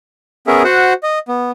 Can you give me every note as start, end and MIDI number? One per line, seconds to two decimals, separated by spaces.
0.47 0.63 59
0.47 0.63 61
0.47 0.63 68
0.47 0.63 70
0.47 0.63 76
0.64 0.93 66
0.64 0.93 72
0.64 0.93 78
1.03 1.19 75
1.28 1.51 59